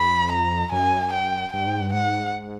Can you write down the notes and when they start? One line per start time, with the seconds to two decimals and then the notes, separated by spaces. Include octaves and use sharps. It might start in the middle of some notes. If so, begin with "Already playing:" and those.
Already playing: F2 B5
0.32 A#5
0.72 F#2 G#5
1.13 G5
1.53 G2 G5
1.67 G#2
1.81 G2
1.93 G#2 F#5